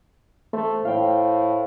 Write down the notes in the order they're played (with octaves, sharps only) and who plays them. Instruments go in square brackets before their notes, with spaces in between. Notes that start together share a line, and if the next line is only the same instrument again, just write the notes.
[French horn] A3 [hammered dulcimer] C5 C6
[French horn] A2 [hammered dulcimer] F5 G5